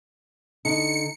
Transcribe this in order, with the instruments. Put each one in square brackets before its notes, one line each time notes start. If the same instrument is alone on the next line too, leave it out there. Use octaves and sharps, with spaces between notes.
[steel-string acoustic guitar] D3 D#4 [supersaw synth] C#7